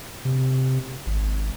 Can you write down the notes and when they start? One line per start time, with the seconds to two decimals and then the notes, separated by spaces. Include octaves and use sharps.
0.25 C3
1.07 G#1